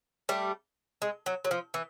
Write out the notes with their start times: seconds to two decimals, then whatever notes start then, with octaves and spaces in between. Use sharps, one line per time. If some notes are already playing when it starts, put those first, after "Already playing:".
0.29 G3 A3
1.02 G#3
1.26 F#3
1.45 F#3
1.51 F3
1.74 E3